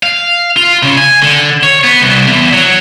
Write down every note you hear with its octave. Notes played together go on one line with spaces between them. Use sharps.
F5
F4
C#3
G#5
D3
C#5
B3
C2
E2
F#3